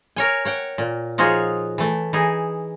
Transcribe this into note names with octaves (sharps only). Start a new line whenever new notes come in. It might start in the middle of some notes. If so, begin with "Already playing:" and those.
A#4 C#5 G#5
C#5 F#5 G5
A#2
F3 D#4 F4 F#4 G#4 C#5
E3 A3
E3 D#4 G#4